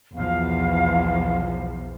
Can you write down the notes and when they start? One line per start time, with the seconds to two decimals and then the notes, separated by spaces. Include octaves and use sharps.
0.15 B1 E2 F3 F5